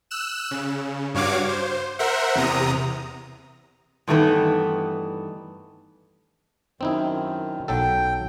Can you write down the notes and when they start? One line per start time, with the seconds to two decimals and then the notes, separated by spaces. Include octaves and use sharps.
0.11 E6 F#6 E7
0.51 C#3
1.14 G2 F#4 C#5 F5 D6 G#6
1.49 C5
1.99 A#4 C5 E5 F#5
2.35 E2 C3 A#5 D#6
4.08 G2 D#3 E3 A3 B3
6.81 F#2 D#3 C4 D#4 E4
7.68 B1 F#3 A4 G5